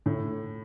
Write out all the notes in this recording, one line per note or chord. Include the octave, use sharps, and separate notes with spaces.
A2